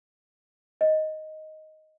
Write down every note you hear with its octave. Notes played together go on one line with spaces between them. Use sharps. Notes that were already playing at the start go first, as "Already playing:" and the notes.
D#5